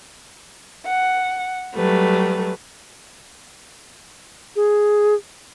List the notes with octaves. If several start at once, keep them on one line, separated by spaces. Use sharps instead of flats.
F#5
F#3 G3 A3 B4
G#4